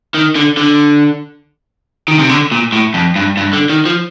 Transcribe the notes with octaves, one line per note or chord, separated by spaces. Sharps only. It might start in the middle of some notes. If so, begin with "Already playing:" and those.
D#3
D3
D3
D#3
C3
D3
A#2
A2
F2
G2
G2
D3
D#3
F3